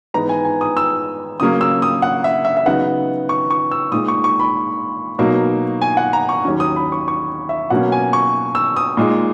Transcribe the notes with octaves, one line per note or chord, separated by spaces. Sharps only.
G#2 E3 B3 D#4 A#5
G#5
G#5
D#6
E6
C#3 F#3 A#3 C#4 D#6
E6
D#6
F#5
E5
E5
E5
C#3 F#3 B3 D#4 F#5
C#6
C#6
E6
A#2 G#3 D#4 D#6
C#6
C#6
B5
B2 F#3 A#3 D#4
G#5
F#5
A#5
C#6
D#2 D#3 F#3 C#4
D#6
B5
C#6
C#6
E5
B2 F#3 A#3 C#4 F#5
G#5
C#6
E6
D#6
A#2 G#3 D#4